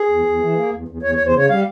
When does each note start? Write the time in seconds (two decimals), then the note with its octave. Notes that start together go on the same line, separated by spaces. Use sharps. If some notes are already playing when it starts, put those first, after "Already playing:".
Already playing: G#4
0.09 E2
0.25 E2
0.40 E3
0.56 A#3
0.72 E2
0.88 E2
1.02 E2 C#5
1.15 E2 C#5
1.26 C5
1.34 C#3 C#5
1.49 G3 F5